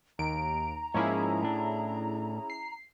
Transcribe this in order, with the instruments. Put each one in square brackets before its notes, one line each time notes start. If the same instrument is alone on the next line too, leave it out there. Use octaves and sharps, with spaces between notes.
[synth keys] D#2 D7 [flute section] A#5
[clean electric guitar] G#2 F3 A#3 [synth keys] C#4 E4 G#4
[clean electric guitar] A2 D4
[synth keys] C7